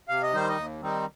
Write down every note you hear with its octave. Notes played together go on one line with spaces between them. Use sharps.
C3 F5
D#5
D#3 G3 D#4 C5
D#4 D#5
D#2
D#3 G3 C4 D#4